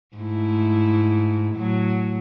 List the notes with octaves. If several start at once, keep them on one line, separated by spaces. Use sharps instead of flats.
G#2 A3 E4
A2 F#3